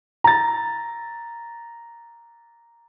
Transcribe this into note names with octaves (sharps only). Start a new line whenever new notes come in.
A#5 A6